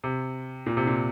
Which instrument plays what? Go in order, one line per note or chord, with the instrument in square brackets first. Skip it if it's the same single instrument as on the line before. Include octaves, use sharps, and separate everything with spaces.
[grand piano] C3
A#2
C3
A#2